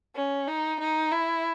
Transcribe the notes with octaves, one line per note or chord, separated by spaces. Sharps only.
C#4
D#4
D#4
E4